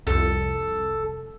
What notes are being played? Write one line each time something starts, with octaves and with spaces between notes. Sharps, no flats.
C2 F2 A4